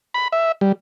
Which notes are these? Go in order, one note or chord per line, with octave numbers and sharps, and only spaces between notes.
B5
E5
G3